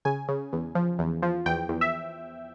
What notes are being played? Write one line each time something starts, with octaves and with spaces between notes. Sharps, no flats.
C#3 G#5
C#3
E2
F3
E2
F3
E2 G5
E2
E5